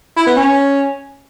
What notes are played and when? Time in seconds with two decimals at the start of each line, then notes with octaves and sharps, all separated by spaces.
0.17 E4
0.27 B3
0.36 C#4